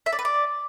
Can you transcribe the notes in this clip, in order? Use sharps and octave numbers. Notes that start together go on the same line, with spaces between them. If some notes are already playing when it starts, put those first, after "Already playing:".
E5
D5
B4
D5